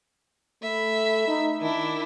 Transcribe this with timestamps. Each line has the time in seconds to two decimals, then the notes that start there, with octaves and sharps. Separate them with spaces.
0.62 A3 E5 B5
1.28 D#4
1.61 D#3 D4 E4